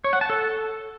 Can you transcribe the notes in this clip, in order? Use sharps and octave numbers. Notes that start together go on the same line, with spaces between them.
C#5
F#5
A5
A4